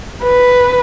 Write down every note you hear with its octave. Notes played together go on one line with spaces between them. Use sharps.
B4